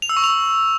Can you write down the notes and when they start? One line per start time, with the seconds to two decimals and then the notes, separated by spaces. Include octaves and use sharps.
0.02 F7
0.09 E6
0.17 C#6
0.24 F7